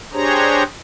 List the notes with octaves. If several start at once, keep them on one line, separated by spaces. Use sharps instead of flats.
D4 G4 G#4 C5 C#5 A#5